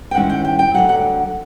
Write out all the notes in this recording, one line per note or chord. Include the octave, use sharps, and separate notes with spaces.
G5
G2 D#3 G#3 C#4 E4 F#5
G5
G5
G5
D2 D3 F#3 F#5
F#5